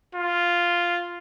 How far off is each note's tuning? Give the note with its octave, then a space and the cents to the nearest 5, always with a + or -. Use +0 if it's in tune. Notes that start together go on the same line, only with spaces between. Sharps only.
F4 -5